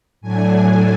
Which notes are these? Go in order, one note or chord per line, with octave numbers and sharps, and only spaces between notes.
A2 F#3 A3 D4 G#5